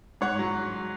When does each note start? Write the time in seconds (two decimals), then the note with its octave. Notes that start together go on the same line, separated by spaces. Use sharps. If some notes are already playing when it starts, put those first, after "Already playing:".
0.21 G#2 C#5 F#5
0.39 F#3